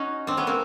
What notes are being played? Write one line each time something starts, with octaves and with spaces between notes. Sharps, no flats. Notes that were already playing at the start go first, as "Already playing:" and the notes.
Already playing: C#4 D#4 F#4
C4 D4
B3 C#4
A#3 C4